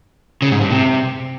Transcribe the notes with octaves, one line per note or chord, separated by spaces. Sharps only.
C#3
G#2
G2
C3